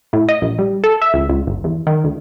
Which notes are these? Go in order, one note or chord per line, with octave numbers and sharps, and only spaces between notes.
A2
D#5
A#1
G3
A4
E5
C#2
C#2
G1
E2
D#3
D2